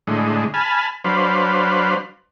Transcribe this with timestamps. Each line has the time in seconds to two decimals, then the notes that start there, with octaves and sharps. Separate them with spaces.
0.07 A2 D3 G#3
0.54 G#5 A5 B5 F6
1.04 F#3 D4 B4 C5 F5